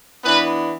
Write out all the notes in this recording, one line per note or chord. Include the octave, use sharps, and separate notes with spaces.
E3 B3 D4 B4